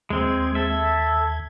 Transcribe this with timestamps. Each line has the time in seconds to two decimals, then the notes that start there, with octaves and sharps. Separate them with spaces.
0.10 D#2 G#3 C4 G#6
0.55 A4 E5